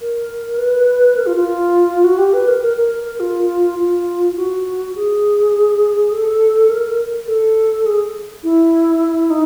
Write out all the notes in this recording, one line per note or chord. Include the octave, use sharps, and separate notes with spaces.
A#4
B4
A#4
F4
F4
F#4
G4
B4
A#4
A#4
A#4
F4
F4
F#4
G#4
A4
A#4
A4
G#4
E4
D#4